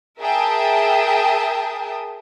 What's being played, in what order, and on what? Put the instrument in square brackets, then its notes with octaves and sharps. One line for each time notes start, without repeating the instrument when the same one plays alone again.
[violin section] G#4 A#4 E5 G5 A5 D#6